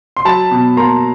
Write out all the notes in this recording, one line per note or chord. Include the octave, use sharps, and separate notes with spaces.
C6
F#3 A5 B5
B2
A#3 A#5 C6